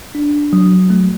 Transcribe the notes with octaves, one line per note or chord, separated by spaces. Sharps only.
D4
F#3
A3